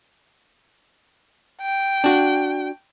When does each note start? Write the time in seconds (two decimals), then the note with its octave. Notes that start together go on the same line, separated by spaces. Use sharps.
1.62 G5
2.04 D4 F#4